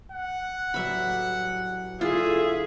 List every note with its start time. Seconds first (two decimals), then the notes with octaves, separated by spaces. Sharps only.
0.12 F#5
0.74 A1 F#3 G3 E5 B5
2.01 G1 E4 F4 G#4 E5